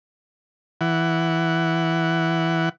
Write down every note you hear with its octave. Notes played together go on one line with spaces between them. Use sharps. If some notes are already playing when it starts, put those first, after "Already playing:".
E3 F#5